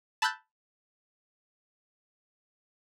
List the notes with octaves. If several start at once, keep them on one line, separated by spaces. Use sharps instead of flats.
A5 B5 E6 F#6 G6 A6